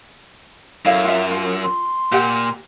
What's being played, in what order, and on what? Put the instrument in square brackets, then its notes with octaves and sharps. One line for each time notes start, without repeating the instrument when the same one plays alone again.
[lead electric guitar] F#2 [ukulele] E4 A4 F5
[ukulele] F4 E5
F4
[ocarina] C6
[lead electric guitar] A#2 [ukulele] G4 F#5